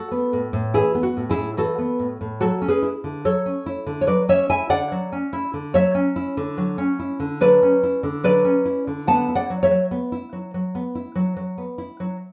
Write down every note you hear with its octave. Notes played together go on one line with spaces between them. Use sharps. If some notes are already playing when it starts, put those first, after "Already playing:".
Already playing: F#4 A4
B3
A2
A2
E3 E4 G#4
B3
F#4
A2
E4 G#4
A2
E3 F#4 A4
B3
A2
A2
F#3 F#4 A4
C#4
G#4 B4
E4
D3
F#3 A4 C#5
C#4
E4
D3
C#5
F#3 B4 D5
C#4 C#5 E5
E4 E5 G#5
D3 D5 F#5
F#3
C#4
E4
D3
F#3 C#5 E5
C#4
E4
D3
F#3
C#4
E4
D3
F#3 B4 D5
C#4
E4
D3
F#3 B4 D5
C#4
E4
D3
B3 F#5 A5
E4
D5 F#5
F#3
C#5 E5
F#3
B3
E4
F#3
F#3
B3
E4
F#3
F#3
B3
E4
F#3